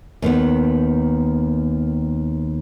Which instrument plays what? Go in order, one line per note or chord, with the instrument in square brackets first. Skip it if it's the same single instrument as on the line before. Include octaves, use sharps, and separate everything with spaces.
[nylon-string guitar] D#2 D#3 B3